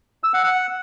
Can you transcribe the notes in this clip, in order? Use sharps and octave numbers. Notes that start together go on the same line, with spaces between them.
E6
F#5
F#5